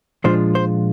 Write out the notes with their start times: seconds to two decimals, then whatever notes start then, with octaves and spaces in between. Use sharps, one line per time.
0.24 A#2 F3 G#3 D4 F4 C5
0.55 C5